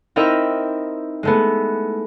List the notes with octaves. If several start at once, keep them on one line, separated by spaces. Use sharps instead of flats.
C4 D#4 E4 A#4 D#5 E5
G#3 A3 B3